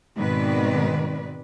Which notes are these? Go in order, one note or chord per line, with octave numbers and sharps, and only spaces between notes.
G#2 B2 D#3 C4 B4 D5